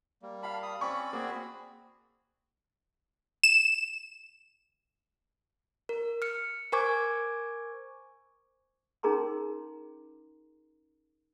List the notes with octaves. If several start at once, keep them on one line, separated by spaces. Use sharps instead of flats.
G3 A#3
F5 A5 B5
D#6
C4 C#4 D5 B5 C#6
A#3 C4 F#4 G#4
E7
A#4
F6 C#7
A#4 C5 G#5 C#6 D6 G#6
C#4 D#4 G#4 A#4 A#5 C6